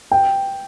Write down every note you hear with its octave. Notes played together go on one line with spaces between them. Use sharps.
G5